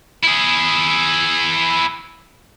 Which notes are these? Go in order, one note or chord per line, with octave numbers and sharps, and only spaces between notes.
E4 G#4